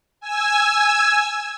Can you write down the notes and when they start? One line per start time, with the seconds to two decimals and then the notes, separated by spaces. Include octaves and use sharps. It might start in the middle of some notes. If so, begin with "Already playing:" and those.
0.20 G#5 E6 G#6